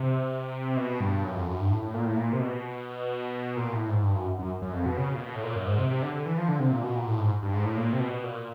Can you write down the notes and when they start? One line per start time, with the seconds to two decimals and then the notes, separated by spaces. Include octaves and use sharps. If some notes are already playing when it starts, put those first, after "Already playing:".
Already playing: C3
0.77 B2
1.00 G2
1.24 F#2
1.35 F2
1.46 F#2
1.59 G2
1.70 A2
1.82 A2
1.94 A#2
2.06 A2
2.17 A#2
2.33 C3
2.40 B2
3.57 A#2
3.73 A2
3.89 G#2
4.03 G2
4.15 F#2
4.39 F#2
4.62 F#2
4.73 F2
4.86 B2
4.97 C#3
5.15 A#2
5.20 B2
5.35 A2
5.44 A#2
5.56 F#2
5.67 G#2
5.78 C3
5.91 C3
6.02 D3
6.14 D3
6.26 E3
6.37 F3
6.48 D3
6.60 C3
6.72 A#2
6.84 B2
6.95 A#2
7.07 A2
7.19 G#2
7.42 G2
7.53 G#2
7.65 A2
7.77 A#2
7.93 C3
8.00 B2
8.23 A#2